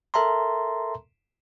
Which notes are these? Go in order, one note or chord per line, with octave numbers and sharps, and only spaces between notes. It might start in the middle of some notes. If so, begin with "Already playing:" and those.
A4 A#4 E5 A5 A#5 C6